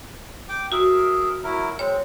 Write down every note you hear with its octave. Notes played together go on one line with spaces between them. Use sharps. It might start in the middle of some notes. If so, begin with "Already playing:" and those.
G5 D6
F#4 G#4 A#4 E5
F#3 E4 A#4
G#3 C4 C#5